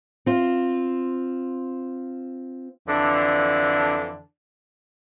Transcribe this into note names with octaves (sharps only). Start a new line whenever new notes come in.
C4 F4
F2 D3 E3 D4